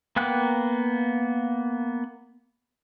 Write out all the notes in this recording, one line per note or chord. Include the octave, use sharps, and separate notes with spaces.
A#3 B3 G5 F#6